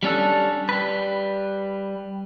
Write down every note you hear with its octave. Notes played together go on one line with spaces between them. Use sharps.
G3 C#4 D4 A4
G3 B4